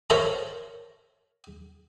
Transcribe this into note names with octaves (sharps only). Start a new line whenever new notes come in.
A#4 C5 C#5 E5 A5 A#5